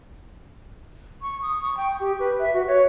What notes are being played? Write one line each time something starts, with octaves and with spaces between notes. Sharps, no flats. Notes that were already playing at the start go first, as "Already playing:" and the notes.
C#6
D#6
C#6
G5
G4
B4
E5
F#4
C#5